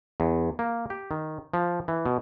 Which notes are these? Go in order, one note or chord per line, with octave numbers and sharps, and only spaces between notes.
E2
A#3
G4
D#3
F3
E3
B2